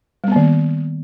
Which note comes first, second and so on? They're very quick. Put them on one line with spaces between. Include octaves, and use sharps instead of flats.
G3 B3 A#3 D#3